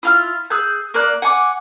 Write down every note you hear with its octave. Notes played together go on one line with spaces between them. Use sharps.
E4 F4 F6
G#4 E6 F#6 G6
A#3 D5 F#6
F#5 G#5 D6